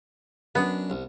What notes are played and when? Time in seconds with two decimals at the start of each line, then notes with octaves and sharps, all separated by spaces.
0.55 F#2 B3 D4
0.90 C2